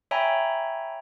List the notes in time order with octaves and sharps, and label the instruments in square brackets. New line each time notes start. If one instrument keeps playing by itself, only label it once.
[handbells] C#5 E5 G5 G#5 A#5 B5